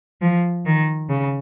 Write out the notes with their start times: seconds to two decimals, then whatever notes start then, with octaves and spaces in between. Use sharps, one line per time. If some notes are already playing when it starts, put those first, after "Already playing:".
0.21 F3
0.65 D#3
1.09 C#3